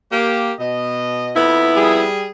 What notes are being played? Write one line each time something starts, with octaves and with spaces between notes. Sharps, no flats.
A#3 G4
B2 D#5
F2 B3 E4
G3 G#4